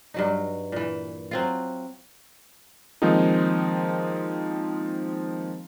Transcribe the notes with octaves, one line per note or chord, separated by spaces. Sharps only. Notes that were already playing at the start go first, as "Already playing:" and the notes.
G2 F#3 D#4
A#2 E3
F#3 C4 F4
D#3 F3 G#3 A#3 C4 D#4